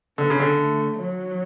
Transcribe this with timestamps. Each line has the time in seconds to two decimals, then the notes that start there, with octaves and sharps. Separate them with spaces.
0.18 D3 B3
0.30 C#3
0.40 D3
0.59 A3
0.99 F#3